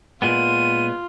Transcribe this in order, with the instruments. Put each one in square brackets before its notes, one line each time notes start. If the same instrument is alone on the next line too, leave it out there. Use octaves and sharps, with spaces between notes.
[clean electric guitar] A#2 G#3 B3 [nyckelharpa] F4 [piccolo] D#7